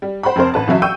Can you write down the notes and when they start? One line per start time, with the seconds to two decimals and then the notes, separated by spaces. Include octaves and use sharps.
0.02 G3
0.23 C5 F#5 G5 B5
0.36 F1 C4 A#4 C5
0.54 A1 B4 A5
0.67 C#2 E3 F#3 E5
0.82 G5 C#6 E6 G6 D#7